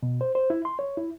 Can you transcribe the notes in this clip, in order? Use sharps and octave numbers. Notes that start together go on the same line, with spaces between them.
B2
C5
C5
E4
C6
C#5
E4